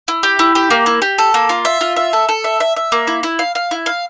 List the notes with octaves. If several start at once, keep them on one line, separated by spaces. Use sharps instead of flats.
E4
G4
E4
G4
A#3
E4
G4
A4
A#3
F4
E5
F4
E5
A4
A4
E5
E5
E5
A#3
E4
E4
F5
F5
E4
F5